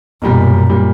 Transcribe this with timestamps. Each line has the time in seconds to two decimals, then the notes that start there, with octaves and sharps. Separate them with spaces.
0.22 B1 F#2 A#2 G3
0.69 A#2 G3